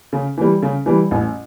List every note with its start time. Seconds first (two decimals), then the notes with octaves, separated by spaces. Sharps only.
0.13 C#3
0.38 E3 G3
0.62 C#3
0.86 E3 G3
1.11 A1